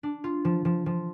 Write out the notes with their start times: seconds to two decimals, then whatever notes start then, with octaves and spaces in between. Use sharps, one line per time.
0.03 D4
0.24 F4
0.45 F3
0.65 F3
0.86 F3